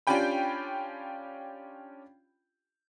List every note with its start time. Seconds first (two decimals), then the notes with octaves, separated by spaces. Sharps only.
0.07 C#4 D4 F4 G4 G5 B5